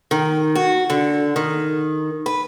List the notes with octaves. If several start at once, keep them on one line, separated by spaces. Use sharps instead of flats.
D#3
F#4
D3
D#3
B4